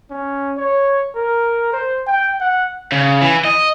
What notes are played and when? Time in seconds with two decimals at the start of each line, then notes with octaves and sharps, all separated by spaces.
0.11 C#4
0.57 C#5
1.15 A#4
1.72 C5
2.07 G5
2.41 F#5
2.92 C#3
3.22 E3
3.44 D#5